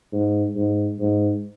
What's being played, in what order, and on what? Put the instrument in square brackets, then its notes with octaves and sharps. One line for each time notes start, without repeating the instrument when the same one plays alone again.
[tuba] G#2
G#2
G#2